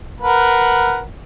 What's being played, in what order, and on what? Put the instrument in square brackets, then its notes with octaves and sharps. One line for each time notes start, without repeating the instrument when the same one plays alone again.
[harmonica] A#4 B4 F#5